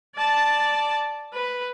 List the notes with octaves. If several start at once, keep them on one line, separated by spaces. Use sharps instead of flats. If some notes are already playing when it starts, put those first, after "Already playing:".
D5 A5
B4